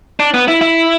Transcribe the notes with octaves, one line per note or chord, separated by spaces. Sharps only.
D4
B3
E4
E4